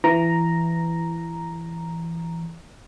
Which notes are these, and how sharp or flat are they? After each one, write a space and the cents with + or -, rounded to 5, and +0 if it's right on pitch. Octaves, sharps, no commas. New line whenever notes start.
E3 +20 A#5 +0